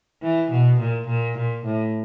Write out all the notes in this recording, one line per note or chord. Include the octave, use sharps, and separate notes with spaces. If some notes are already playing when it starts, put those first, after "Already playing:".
E3
B2
A#2
A#2
A#2
A2